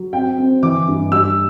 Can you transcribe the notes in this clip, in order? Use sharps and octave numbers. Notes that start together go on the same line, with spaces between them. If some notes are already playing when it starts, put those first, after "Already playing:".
Already playing: F#3
C4 G5
C4
E3 D6
G2
G3 E6